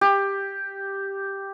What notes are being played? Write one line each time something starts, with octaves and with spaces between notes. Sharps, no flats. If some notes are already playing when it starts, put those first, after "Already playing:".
G4